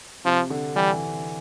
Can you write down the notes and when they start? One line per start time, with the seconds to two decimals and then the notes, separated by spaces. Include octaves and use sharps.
0.25 C3 F3
0.50 D3
0.75 E3 G3